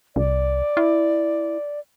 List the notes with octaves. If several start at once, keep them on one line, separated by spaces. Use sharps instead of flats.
C2 D5
E4